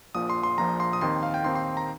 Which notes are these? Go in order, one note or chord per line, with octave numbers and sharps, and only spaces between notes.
A#1 A#2 F3 D#6
C6
C6
A#1 A#2 F3 A#5
C6
D#6
D#2 D#3 C4 D#4 C6
F5
G5
D#2 D#3 C4 D#4 C6
C6
A#5